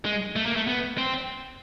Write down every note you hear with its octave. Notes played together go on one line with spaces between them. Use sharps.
G#3
A3
A#3
A3
B3
C4